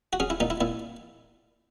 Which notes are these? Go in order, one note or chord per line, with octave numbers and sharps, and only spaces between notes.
F#4
C#4 G#4
E4
A#2 D#4
E4
A#2 E4